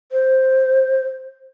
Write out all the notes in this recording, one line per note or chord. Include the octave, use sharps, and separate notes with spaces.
C5